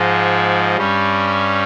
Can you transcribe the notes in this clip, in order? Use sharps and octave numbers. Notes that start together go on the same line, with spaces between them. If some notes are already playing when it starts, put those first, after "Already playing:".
Already playing: G#2 F3 G#3
G2 G3 C#4